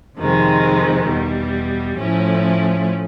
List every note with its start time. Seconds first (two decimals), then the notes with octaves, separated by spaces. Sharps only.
0.18 F2 C3 D#3 G#3
1.08 E2 B2 G3
1.99 A2 F3 A3 C#4 E4